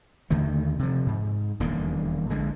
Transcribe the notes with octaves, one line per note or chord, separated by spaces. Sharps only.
D#2 D3 D#3 A3
C3 F3
G#2
D#1 E2 D3 A#3
A#1 D3 G#3